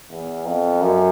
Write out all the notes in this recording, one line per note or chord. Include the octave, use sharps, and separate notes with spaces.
E2
F2
F#2